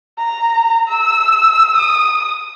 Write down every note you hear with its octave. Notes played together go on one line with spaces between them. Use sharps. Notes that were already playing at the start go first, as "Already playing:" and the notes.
A#5
E6
D#6